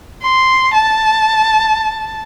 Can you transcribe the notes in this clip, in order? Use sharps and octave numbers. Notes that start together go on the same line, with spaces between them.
C6
A5